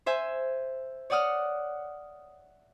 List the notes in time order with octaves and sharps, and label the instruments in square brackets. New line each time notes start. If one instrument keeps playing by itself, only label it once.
[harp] C5 E5 G#5
C#5 D5 F#5 D#6 F6